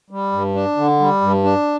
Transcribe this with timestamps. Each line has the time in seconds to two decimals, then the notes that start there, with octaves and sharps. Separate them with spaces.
0.10 G3
0.32 G2
0.54 D4
0.77 D3
1.00 G3
1.21 G2
1.44 D4